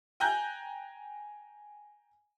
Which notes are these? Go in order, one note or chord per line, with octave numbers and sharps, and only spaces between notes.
G5 G#5 A#5 F#6 G6